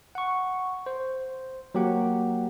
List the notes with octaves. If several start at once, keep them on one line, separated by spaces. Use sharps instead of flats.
F#5 C#6
C5
F#3 A#3 G4 F#5